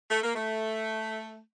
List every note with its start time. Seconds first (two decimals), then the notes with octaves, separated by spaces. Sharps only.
0.10 A3
0.23 A#3
0.34 A3